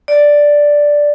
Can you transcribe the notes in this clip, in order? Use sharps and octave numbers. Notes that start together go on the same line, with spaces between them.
D5